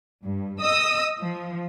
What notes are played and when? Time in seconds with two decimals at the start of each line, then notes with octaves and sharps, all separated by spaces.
0.24 G2
0.62 D#5 D#6 E6
1.21 F3